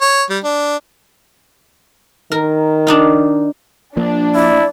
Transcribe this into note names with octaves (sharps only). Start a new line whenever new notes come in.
C#5
G3
D4
D#3 A#4
D4 D#4 F4
F3 A#3 D4
E4 D5